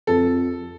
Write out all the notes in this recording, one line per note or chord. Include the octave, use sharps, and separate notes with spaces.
F2 A4